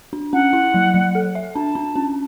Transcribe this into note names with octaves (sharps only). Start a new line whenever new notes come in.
D4
C#4 F#5
E4
F#3
F#3
A4
E5
D4 A5
D4
C#4